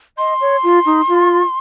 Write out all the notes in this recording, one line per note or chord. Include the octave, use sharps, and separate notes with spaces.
D#5 C6
C#5
F4
D#4
F4